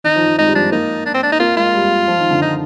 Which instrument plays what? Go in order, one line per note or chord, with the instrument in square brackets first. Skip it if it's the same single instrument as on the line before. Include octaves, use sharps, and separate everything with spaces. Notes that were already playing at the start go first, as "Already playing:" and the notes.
[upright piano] D#3 [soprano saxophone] D#4
[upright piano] F3
F3
[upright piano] G#3 [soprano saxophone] D#4
[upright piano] G3
[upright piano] F3 [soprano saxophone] D4
[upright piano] A#3 [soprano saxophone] D#4
[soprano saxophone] D4
C4
D4
D#4
[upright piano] A#3 [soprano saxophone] F4
[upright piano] G#3 [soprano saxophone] F4
[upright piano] G3
F3
D#3
D3
[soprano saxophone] D#4